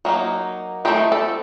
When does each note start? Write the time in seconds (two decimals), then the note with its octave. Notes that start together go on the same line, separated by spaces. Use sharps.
0.05 F#3 A#3 D#4
0.85 E3 A3 C4 D#4 G4
1.12 A4